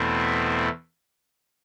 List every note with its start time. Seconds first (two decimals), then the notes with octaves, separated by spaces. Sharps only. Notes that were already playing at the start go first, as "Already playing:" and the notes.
Already playing: E2 B2 A3 C4 E4